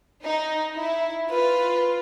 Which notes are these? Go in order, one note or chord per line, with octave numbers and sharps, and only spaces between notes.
D#4
E4
F4 B4